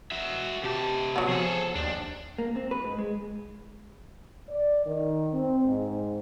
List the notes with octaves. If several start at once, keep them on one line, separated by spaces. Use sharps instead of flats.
F#4 E5
C3 G4 A5
F#3 B3
F3 G#4 A4
D#2 D4
A#3
C4
B4
G#2
G#3
D5
D#3
C4
G#2